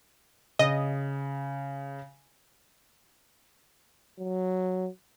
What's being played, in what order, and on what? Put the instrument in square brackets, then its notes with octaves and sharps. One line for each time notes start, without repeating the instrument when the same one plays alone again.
[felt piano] C#3 [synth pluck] D#5
[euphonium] F#3